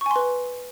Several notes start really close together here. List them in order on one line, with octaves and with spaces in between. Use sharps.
C#6 G#5 C6 B4